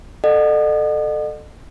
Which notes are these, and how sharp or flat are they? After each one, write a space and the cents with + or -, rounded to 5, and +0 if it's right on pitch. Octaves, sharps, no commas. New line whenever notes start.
A4 +0 D#5 -45 F#5 -10